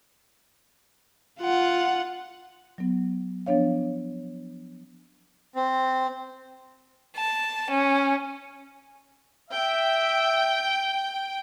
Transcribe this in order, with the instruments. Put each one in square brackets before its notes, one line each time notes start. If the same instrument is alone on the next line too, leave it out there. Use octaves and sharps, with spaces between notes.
[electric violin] F4 F#5
[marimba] F#3 B3
F3 B3 D4 C#5 F5
[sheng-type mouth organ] C4
[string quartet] A5
C#4
[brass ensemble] E5 [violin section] G5